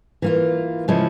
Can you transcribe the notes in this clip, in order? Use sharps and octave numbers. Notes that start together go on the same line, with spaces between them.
E3 A#3 F4
C#3 F3 G#3 C#4 E4